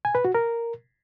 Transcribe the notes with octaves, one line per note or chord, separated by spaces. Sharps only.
G#5
B4
F#4
A#4